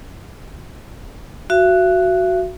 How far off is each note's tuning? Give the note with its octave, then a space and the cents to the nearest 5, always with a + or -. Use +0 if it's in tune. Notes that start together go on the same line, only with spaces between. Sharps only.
F#4 +0 E5 +45